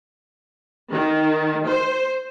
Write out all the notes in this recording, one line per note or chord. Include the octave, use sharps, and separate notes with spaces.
D#3
C5